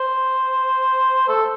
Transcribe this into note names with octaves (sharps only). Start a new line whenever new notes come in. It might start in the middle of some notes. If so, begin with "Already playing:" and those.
Already playing: C5
A4